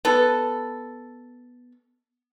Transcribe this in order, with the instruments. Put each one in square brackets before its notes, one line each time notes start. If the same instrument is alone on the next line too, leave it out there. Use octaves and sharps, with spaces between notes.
[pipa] B3 A4